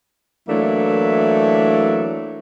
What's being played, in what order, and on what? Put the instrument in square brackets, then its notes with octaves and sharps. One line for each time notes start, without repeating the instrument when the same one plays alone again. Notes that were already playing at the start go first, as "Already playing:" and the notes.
[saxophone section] E3 F#3 A3 A#3 D4 E4